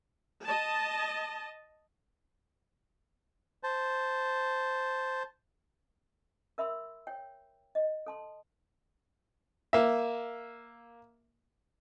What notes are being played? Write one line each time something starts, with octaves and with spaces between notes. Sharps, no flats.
D#5 A5
C5 A5
A#4 E5 B5 C6 E6
C#5 G5
D#5
A4 A5 C6
A#3 E5